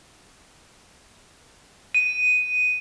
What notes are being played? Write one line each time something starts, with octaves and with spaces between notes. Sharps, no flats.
D#7